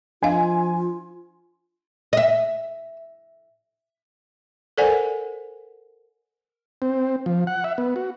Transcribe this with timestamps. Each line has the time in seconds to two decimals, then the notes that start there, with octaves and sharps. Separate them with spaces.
0.23 F3 D4 F4 D#5 F5 G#5
2.13 D#5 E5
4.78 A4 A#4 C5 D5 F#5 G#5
6.82 C4
7.26 F3
7.47 F#5
7.64 E5
7.78 B3
7.96 F#4